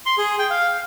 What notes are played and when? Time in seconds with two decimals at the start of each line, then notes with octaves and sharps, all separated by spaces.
0.06 C6
0.18 G#4
0.39 G5
0.50 F5